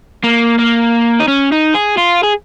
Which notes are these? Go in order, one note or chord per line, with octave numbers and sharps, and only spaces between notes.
A#3
A#3
D#4
C#4
D#4
G#4
F4
G#4